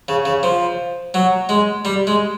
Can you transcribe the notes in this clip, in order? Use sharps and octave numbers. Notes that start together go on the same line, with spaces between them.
C#3
C#3
F3
F#3
G#3
G3
G#3